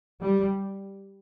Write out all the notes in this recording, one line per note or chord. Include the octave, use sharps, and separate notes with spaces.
G3